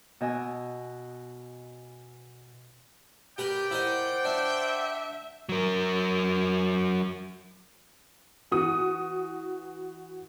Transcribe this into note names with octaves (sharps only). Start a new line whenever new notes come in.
B2 D#5 G#5 E6
G4 A#4 B4 D5 G5
E4 A#4 C5 D#5 F#5
D4 E5
F#3 A#4
E3 F#4 D#6